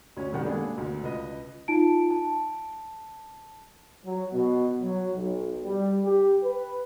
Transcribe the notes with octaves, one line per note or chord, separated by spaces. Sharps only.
D2 C#4
C2 F#2 D#3 F#5 G5
G#3 A#3 B3 D4 G#4 A4
D2 D3
C#2 B4 D#5
D#4 F4 A5 D7
A5
F#3
B2
F#3
B1
G3
G4
B4